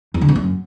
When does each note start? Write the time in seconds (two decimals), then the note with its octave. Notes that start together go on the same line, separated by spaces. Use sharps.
0.14 E2
0.21 D3
0.28 G#2
0.36 F#2